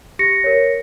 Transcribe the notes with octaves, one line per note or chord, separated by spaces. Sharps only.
G4 A#6 C#7
A#4 C#5